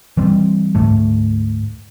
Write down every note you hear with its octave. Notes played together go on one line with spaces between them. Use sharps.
E3 G3 C4
D2 G#2 A3